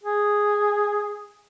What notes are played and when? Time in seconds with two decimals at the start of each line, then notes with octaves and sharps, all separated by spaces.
0.03 G#4